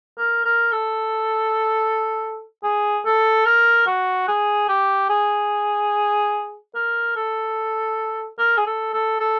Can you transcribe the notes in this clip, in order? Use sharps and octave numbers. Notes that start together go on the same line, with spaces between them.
A#4
A#4
A4
G#4
A4
A#4
F#4
G#4
G4
G#4
A#4
A4
A#4
G#4
A4
A4
A4